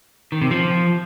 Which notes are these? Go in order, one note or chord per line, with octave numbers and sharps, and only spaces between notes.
D#3
C3
F3